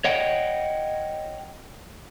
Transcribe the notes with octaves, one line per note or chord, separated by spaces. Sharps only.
C#5 D#5 F#5 G5